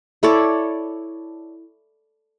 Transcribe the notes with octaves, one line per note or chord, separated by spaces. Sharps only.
E4 A4 C#5 D5